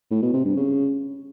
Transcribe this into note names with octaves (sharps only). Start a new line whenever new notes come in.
A2
B2
C3
G2
C#3